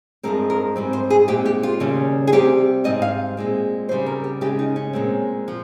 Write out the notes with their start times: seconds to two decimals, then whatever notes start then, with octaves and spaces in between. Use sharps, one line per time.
0.23 G2 F3 G#3 C4 A#4
0.50 A#4
0.76 G#2 G3 C4
0.93 C5
1.10 G#4
1.28 A#2 G#3 C4 G4
1.46 G4
1.63 F4
1.80 D#2 C#3 G3 C#4
2.27 G#4
2.32 C3 G3 C4 G4
2.84 G#2 G3 C4 D#5
3.02 F5
3.37 A#2 G#3 C4
3.88 C4 C5
3.91 C#3 G3
4.06 A#4
4.24 G4
4.41 C#3 G#3 C#4 G4
4.59 D#4
4.76 C#4
4.93 A#2 G#3 C4
5.48 F3